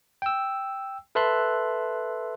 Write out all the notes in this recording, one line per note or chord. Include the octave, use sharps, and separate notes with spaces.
G5 E6
A4 B4 E5 A5 C6 F#6